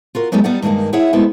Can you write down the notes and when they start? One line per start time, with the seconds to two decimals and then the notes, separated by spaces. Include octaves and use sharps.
0.15 F4 F#4 A#4
0.32 F#3 G#3 B3 D#4 G4 A4
0.44 G3 B3 D#4 D5 F#5
0.62 G2 D#3 G#3 A#3 D#4
0.93 E4 G#4 C#5 E5 F#5
1.13 G#3 A3 B3 C4 E4 A4